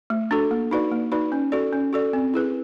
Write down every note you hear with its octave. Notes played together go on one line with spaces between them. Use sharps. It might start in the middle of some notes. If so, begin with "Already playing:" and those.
A3
D4 F#4 A4
A#3
D#4 F#4 B4 D5
A#3
D#4 F#4 B4 D5
C#4
F#4 A4 D5
C#4
F#4 A4 D5
C4
E4 G#4 B4